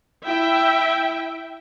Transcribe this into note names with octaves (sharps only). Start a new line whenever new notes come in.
E4 E5 G5